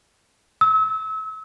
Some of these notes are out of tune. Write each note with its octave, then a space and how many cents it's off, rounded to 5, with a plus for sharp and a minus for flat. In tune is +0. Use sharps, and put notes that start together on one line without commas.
E6 -35